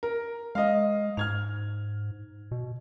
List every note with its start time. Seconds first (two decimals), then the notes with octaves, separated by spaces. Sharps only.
0.03 A#4
0.55 G#3 D#5 F5
1.17 G#2 F6 G#6 F7
2.51 B2